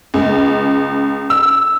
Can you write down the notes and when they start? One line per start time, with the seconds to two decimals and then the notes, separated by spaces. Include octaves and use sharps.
0.14 C#2
1.30 E6